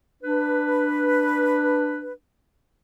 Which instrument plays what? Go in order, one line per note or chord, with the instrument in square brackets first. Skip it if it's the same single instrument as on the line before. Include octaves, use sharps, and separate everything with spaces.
[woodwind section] D4 B4